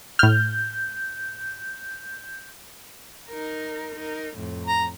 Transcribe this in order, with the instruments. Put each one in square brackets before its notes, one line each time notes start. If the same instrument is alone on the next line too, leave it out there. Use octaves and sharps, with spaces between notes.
[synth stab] A2 F6 [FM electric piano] G6
[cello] D#4 A#4
D#4 A#4
F2 A2
[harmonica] A#5